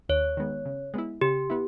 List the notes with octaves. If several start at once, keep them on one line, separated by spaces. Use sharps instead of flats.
D#2 C#5
D#3 G#3 B3
C#3
G#3 B3 E4
C#3 G4
B3 E4